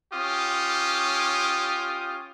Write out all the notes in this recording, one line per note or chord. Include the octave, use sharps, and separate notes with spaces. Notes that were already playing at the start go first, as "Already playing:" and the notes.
C#4 F4 G4 D#6